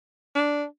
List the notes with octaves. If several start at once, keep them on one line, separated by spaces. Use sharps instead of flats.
D4